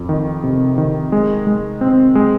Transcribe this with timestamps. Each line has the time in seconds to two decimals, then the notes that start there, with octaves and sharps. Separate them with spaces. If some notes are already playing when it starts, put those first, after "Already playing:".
Already playing: F2
0.09 D#3
0.43 C3
0.78 D#3
1.12 G#3
1.47 G#3
1.81 C4
2.15 G#3